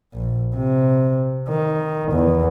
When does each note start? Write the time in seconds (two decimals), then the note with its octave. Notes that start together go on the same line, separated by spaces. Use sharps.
0.14 A#1
0.56 C3
1.49 D#3
2.12 E2